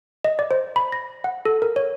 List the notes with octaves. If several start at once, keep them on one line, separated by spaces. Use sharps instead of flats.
D#5
D5
C5
B5
A#6
F#5
A4
A#4
C#5